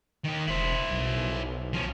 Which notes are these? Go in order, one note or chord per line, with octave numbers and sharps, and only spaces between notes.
D#3 G4
E1 E4 C5
B1
F3 C#4